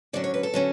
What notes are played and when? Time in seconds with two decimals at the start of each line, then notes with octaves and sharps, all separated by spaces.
0.13 D3 F#3 C#4 D5
0.24 C#5
0.34 B4
0.43 A4
0.54 D3 F#3 C#4